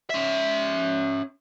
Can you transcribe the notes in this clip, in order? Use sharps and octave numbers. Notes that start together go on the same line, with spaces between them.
C#4 E5